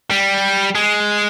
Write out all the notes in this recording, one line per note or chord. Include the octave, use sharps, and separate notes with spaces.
G3
G#3